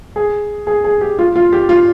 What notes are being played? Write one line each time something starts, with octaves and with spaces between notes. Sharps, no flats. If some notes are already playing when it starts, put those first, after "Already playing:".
G#4
G#4
G#4
G4
F4
F4
G4
F4